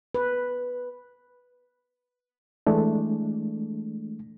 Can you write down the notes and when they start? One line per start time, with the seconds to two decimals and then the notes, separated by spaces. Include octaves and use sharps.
0.15 B4
2.67 E3 G#3 A3 D4